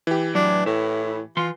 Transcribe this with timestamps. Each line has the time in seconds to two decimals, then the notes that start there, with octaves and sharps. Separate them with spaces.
0.07 E3 G4
0.35 A2 F#3 D4
0.66 A2 E4
1.37 E3 F4 C6